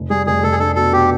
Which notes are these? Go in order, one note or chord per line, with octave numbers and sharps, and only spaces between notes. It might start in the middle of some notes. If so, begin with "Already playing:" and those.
Already playing: F1
G3 G#4
F1 G#4
F1 A4
G#4
D4 A4
B2 A4
B2 G4